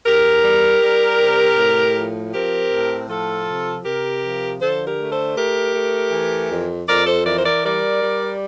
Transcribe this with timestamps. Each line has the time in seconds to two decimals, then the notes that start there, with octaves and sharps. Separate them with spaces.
0.06 E2 G4 A#4
0.44 G3
0.82 G3
1.20 C3
1.57 A2
1.96 F3
2.33 C4 G4 A#4
2.71 A2
3.09 F3 F4 A4
3.47 C3
3.84 C3 G4 A#4
4.23 F3
4.61 D3 A4 C5
4.86 G4 A#4
4.98 A3
5.11 A4 C5
5.37 A3 G4 A#4
5.74 A3
6.12 E3
6.50 F2
6.88 F2 A#4 D5
7.06 A4 C5
7.26 E3 A#4 D5
7.38 C5
7.45 A#4 D5
7.64 G3 A#4 D5
8.02 G3